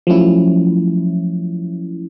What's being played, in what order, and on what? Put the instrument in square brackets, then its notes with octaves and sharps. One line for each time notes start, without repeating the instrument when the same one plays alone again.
[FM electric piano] F3 F#3 A3 C#4 E4